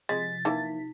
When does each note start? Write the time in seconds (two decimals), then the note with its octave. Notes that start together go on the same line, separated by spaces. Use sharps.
0.09 C3 F3 G#3 A6 B6
0.45 E3 A#3 D#4